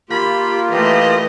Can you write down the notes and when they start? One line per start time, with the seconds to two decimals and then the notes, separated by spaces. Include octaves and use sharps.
0.10 A#3 F4 G4 B5
0.71 E3 A3 G4 D#5